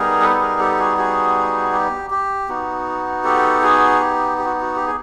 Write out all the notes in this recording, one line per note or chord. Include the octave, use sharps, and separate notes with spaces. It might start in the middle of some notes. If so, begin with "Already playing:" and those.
Already playing: G3 B3 D#4 G#4 A#4
A4 B4
A4
G#4 A#4
G4 A4
F#4 G#4
F#4 G#4
G4
G4
B3 D#4 F#4
G4 A4
F#4 G#4
G4
G4
F#4
F#4
G4
G#4